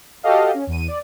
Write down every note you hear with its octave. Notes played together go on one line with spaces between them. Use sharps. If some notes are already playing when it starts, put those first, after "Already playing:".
F#4 G4 A4 D#5 F5
C#4
E2 D#7
D5